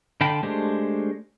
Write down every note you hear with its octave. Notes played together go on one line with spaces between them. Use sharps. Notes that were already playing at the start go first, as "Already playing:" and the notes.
D3 F5 G5 A5 B5
G#3 A3 D4 G4 C5